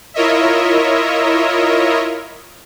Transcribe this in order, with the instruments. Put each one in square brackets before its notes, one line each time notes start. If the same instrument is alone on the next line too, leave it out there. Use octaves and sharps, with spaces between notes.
[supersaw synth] E4 F4 A#4 C#5 D#5 E5